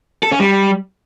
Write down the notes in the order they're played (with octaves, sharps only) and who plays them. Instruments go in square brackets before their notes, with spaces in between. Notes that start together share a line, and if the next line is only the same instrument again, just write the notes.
[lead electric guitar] A4
C#4
G3